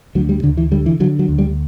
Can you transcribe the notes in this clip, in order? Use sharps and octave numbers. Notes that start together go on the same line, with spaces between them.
D2 F#3
G3
D2 D3
E3
D3 G3
E3
D3 F#3
F#3
D2
G3